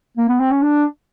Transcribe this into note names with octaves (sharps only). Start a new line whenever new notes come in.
A#3
B3
C4
C#4
D4